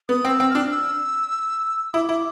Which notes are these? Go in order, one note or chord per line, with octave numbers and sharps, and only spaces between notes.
B3 D#6
C4
E6
C4
D4 F6
E6
E4 D#6
D6
E4